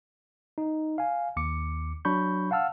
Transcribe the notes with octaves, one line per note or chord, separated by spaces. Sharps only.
D#4
F5 G#5
D#2 D6 C#7
F#3 D4 B5 C#6 G6
F5 F#5 A5 E6 F6